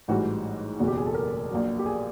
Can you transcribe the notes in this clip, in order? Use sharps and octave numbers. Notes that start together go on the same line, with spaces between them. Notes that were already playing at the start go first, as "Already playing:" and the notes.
A1 G#2 E3 G3 F#4
F#1 E2 B2 F#4
G4
G#4
A4
A#4
A#1 A#2 F#3
G4
G#4